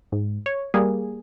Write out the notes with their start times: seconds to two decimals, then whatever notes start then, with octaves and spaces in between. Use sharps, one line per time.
0.12 G#2
0.46 C#5
0.74 G3 A#3 G#4